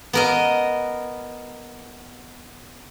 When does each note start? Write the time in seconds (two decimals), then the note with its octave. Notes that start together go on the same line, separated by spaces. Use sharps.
0.13 B3 A#4 D#5